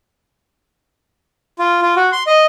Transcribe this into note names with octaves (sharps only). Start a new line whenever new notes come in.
F4
F4
F#4
C6
D#5